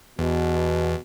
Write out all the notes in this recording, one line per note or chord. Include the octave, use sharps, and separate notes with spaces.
E2 B2